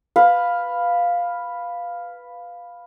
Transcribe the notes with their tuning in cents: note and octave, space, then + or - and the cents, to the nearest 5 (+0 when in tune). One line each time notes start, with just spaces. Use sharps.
B4 +0 F5 +5